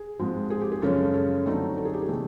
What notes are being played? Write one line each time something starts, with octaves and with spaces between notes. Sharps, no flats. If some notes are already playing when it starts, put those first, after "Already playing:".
Already playing: G#4
G#2 F3 G#3 C4
G#4
G4
G#4
F#2 C#3 F3 G#3 C#4 A4
A4
A4
D3 F#3 A3 C4 D#4
A4
G#4
G4
G#4
C3 E3 A3